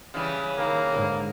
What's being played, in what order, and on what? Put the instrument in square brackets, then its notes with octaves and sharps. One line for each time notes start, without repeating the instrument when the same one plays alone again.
[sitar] C#3 E3 G3
[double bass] D#3 [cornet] A#3
[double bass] G#2 D3